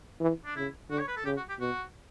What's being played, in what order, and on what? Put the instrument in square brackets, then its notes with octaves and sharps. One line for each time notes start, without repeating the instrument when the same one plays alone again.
[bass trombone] E3
[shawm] D4
[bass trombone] C#3 [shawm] E4
[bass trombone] D3 [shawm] F#4
[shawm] C#5
B4
A4
[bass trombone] C#3 [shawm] G4
[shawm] F#4
G4
[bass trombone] B2 [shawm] F#4